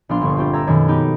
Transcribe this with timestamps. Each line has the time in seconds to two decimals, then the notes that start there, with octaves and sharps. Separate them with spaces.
0.09 A#1 B3 D4 F5 C6
0.21 G1 C#6
0.37 C4 F4 G4
0.53 A4 E5 A#5 G#6
0.67 F#2 B2 D#3 A4 C#5
0.88 B3 D#4 G4